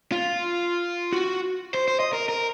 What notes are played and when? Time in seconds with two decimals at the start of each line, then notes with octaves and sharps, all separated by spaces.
0.12 F4
1.13 F#4
1.74 C5
1.88 C5
2.00 D#5
2.13 A#4
2.29 A#4